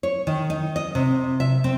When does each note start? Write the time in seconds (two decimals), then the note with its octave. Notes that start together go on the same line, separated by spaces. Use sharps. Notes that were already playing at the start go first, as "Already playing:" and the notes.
0.03 C#5
0.27 D#3
0.50 D#4
0.76 D#5
0.95 C3
1.40 E5
1.64 C4